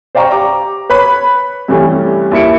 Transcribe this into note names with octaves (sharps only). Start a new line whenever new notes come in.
C5 D5 F5 G5 A#5 C#6
G4 A#5 D6
B4 C#5 B5
G2 C3 E3 G3 A3 C#4
D#2 A#3 E4 E5 C#7 D7